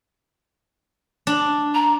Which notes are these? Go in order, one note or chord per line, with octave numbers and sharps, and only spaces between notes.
D4
A#5